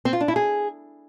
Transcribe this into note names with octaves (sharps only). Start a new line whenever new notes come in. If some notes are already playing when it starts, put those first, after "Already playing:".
C4
F4
D4
E4
G#4